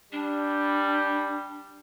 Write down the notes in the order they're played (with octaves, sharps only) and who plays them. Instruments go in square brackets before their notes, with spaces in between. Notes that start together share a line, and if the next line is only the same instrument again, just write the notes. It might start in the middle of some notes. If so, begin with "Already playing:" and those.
[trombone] G3 [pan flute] D4